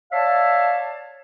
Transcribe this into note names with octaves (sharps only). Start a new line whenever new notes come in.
C#5 D5 E5 F5 A5